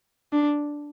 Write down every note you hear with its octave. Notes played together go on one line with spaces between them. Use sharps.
D4